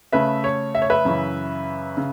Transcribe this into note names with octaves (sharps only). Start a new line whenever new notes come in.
C#3 A3 C#4 B4 E5
C#5
E5
C#5
B4 E5
F#2 C#3 E3 C#4
C#3